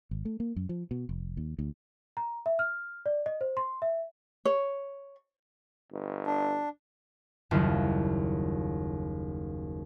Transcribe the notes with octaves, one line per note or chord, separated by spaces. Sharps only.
G#1
A3
A#3
F#2
F3
B2
F1
D#2
D2
A#5
E5
F6
D5
D#5
C5
C6
E5
C#5
G1
D4
F#1 D#2 G3 E4 F4